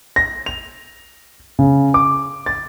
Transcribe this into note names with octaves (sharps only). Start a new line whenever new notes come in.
A#6
F7
C#3
D6
A6